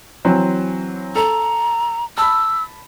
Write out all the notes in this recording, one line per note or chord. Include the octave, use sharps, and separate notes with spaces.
E3 F#3 C4
A4 A#5
A5 B5 E6